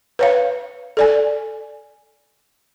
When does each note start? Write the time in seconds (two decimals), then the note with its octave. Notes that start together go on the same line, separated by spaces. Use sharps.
0.19 B4 C#5 F5
0.97 A4 D5 G#5